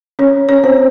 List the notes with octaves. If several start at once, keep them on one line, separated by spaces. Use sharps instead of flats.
C#4 C#5
C#4 C#5
C4 C5